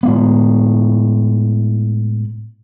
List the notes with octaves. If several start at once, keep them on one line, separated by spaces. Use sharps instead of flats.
A2 G#3 B3